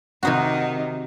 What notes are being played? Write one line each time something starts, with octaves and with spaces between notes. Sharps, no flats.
C3 D#3 D#4 F#4